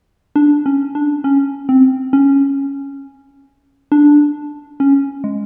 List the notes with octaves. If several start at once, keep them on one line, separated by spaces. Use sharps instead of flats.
D4
C#4
D4
C#4
C4
C#4
D4
C#4
G#3